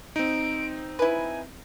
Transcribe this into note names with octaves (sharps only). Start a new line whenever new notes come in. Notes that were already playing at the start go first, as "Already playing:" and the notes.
C4 D#4 D7
E4 B4 G#5